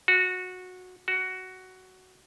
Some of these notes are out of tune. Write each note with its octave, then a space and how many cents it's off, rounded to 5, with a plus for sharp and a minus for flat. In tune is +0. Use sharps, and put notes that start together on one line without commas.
F#4 -15
F#4 +10